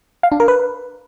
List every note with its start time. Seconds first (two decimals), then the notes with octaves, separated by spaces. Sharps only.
0.23 F5
0.32 D4
0.40 A#4
0.48 B4